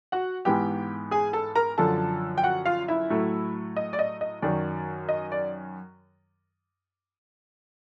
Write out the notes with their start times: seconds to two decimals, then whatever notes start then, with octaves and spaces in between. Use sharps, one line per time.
0.12 F#4 F#5
0.45 G#2 E3 G#3 B3 G4 G5
1.11 G#4 G#5
1.33 A4 A5
1.56 A#4 A#5
1.78 F#2 D3 F3 A4 A5
2.38 G5
2.44 F#4 F#5
2.66 F4 F5
2.88 E4 E5
3.10 A2 F#3 A3
3.76 D#5
3.93 D5
3.99 D#5
4.21 D#5
4.42 F#2 D#3 F#3 D5
5.09 D#5
5.32 D5